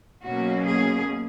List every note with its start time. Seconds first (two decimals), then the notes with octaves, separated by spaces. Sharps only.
0.23 B2 F#3 A#3 C#4 F#4
0.65 G#4